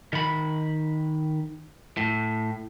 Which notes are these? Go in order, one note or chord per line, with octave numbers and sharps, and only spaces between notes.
D#3 B5
A2